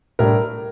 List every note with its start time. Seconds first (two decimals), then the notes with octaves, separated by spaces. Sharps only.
0.19 A2 G3 D4 A#4